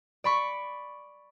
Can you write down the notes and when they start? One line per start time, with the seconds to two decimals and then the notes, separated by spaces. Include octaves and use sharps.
0.24 D5 B5 C#6